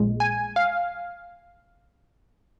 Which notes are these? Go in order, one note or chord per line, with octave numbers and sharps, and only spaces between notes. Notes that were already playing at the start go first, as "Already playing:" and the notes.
Already playing: A#1 A#2 G#3
G#5
F5